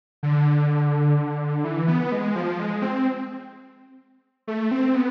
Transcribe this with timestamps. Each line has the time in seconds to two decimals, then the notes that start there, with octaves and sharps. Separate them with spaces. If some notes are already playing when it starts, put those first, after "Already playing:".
0.23 D3
1.64 E3
1.88 B3
2.12 G#3
2.36 F3
2.59 G#3
2.82 C4
4.48 A3
4.71 C4
4.95 B3